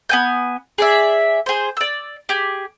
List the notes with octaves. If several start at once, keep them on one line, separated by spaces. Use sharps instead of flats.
B3 G#5 G6
G#4 D5 E5
G#4 C5
D5 E6
G4 G#4